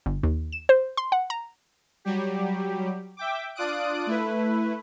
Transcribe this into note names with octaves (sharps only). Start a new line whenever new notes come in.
G1
D#2
E7
C5
C6
F#5
A#5
F#3 G3 G4
E5 G5 D6
D4 F4 D5 D#6 F#6 D7
A3 E4 B4